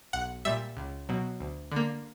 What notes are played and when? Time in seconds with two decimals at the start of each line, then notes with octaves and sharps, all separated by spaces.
0.13 B1 F#5
0.45 A#2 G3 E5
0.77 C#2
1.09 B2 F#3
1.40 D2
1.72 D3 A#3